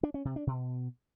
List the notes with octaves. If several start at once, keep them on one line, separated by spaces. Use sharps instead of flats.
D4
C#4
C3
D4
B2